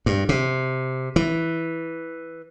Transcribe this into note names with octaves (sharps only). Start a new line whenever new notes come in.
G2
C3
E3